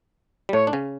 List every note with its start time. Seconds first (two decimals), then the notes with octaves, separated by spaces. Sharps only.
0.49 G3
0.53 A2 A3 C#5
0.67 D4
0.73 C#3 C#4